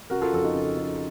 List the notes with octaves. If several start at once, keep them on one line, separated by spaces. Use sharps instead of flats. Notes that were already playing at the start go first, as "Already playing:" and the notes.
C#3 F#4 A#4
F4 A4
F2 A4
D#4 F#4
C#3
C#3